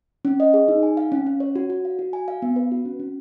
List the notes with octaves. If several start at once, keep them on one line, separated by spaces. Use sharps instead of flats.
C#4
D#5
G#4
D#4
G#5
F5
C#4
C#4
C#5
F#4
F#4
F5
F#4
G#5
F5
B3
B4
F#4
C#4
C#4